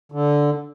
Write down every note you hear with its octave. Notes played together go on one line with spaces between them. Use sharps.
D3